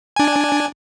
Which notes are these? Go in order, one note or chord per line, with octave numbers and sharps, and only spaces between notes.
D4 G#5